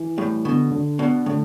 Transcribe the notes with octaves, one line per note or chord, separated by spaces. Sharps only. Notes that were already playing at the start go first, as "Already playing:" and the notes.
Already playing: E3
A2 G3
B2 D3
D3
B2 D4
A2 D3